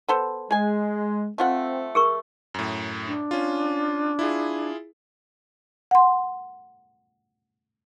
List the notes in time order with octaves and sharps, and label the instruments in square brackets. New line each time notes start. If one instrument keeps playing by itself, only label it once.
[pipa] B3 A4 C5
[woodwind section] G#3 [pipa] G#4 G#5
[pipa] A3 F4 F#5 [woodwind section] C4
[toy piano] G#4 A#4 C#6
[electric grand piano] F#2 A2
[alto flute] D4
[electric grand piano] C#4 F4
E4 F4 G#4
[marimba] F#5 C6